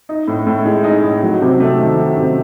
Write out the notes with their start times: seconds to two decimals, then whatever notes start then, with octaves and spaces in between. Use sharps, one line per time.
0.09 D#4
0.28 A2
0.47 A2
0.65 G#3
0.84 D#4
1.04 A2
1.22 F#3
1.42 C3
1.60 A3
1.79 D#3
1.98 F#3
2.17 C3